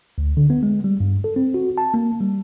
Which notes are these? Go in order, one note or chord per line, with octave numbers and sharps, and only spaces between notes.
D2
D3
B3
G#3
G3
G2
A4
C4
F#4
A5
A#3
G3